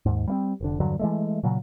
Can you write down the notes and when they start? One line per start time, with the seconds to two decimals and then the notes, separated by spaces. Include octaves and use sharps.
0.06 D#2 G#2
0.28 G3 A#3 C4
0.61 F1 D3
0.80 E2 G2 D3 F#3
0.99 E3 G#3 A3
1.43 A#2 C#3 F#3